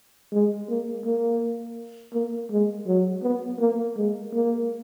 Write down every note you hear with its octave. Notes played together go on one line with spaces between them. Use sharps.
G#3
A#3
A#3
A#3
G#3
F#3
B3
A#3
G#3
A#3